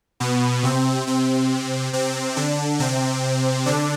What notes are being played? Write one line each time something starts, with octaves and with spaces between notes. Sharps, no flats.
B2 B3
C3 C4
C3 C4
C3 C4
D3 D4
C3 C4
D3 D4